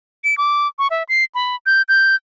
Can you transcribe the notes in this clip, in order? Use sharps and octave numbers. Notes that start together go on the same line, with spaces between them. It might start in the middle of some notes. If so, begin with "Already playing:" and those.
D7
D6
C#6
E5
C7
B5
G6
G6